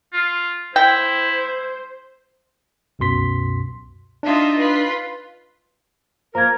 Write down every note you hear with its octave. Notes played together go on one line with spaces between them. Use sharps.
F4
E4 C5 G5
C2 F#2 B2 C6 B6
D4 D#4 F4 E5
F4 B4
F3 A#3 A#4 A#5 G#6